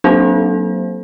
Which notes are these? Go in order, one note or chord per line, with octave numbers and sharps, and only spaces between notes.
F#3 A#3 C4 D4 A4 C5